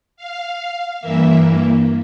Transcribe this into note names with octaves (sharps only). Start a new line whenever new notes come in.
F5
G2 E3 A#3 E5